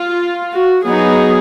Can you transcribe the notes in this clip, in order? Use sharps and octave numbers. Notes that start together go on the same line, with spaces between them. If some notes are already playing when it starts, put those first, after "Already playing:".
Already playing: F4
F#4
F#3 B3 D#4 G#4